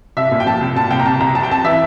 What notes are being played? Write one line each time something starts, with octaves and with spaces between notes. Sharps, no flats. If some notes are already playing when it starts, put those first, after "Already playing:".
C2 E5
A#2
G5
F3 A5
C2
A#2 A5
C2 G5
A#5
C2 A5
C2 A#5
F2 A5
G5
F2 A5
E3 E5